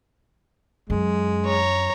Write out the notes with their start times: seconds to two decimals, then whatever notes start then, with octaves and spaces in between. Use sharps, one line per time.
0.90 F#2 G#3
1.46 C#5 A#5